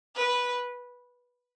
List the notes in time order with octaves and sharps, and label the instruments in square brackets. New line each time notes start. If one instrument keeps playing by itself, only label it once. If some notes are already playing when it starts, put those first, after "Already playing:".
[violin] B4